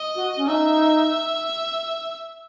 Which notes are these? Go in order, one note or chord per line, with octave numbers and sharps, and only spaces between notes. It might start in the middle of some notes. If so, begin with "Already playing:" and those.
Already playing: D#5
F#4
C#4
D#4 E5